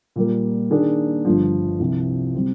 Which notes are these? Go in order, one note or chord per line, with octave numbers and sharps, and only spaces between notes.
A#2 G3 A#3
D#3 A#3 D4 G#4
G1 G2 F3
C2 C3 F3
C3 G3 C4